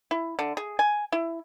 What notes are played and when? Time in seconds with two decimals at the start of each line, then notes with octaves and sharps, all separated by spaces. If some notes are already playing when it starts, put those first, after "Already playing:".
0.11 E4
0.39 D3
0.57 G#4
0.79 G#5
1.12 E4